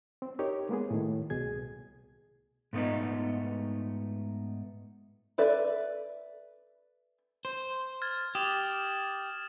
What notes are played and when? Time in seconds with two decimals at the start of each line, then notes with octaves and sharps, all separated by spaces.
0.22 C4
0.39 D#4 G4 A#4 C#5 D#5
0.69 G#3 A#3 B3 G#4
0.91 A2 D#3
1.30 C2 B2 G#4 G#6
2.73 G#2 A3 B3 D#4
5.38 A4 B4 D5 E5
7.45 C5
8.02 F6 G#6 A6
8.35 G4 D#6 E7 F#7